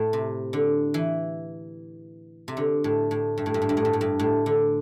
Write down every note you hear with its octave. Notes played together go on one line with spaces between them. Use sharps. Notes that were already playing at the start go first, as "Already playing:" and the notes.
Already playing: A2
C3
D3
E3
C3
D3
A2
A2
G2
A2
G2
A2
G2
A2
G2
A2
G2
A2
D3